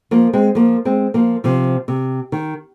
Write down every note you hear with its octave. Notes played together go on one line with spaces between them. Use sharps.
F3 A#3
G#3 C4
F3 A#3
G#3 C4
F3 A#3
C3 F3
C3
D#3